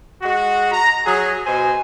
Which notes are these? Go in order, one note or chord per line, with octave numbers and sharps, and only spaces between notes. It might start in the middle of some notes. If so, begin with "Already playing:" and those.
G#3 F#4
A#5
F#3 G#4
B2 C5 G#5